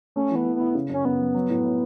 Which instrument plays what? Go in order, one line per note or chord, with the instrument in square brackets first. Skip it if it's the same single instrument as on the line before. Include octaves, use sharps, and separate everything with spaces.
[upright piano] A3 [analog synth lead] C#4
[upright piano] E3 [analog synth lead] B3
[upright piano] E3
[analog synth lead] B3 [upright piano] E4
[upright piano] C#3
[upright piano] F#2 [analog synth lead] C#4
[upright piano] F#2 [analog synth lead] B3
[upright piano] F#3
F#3
A2
E4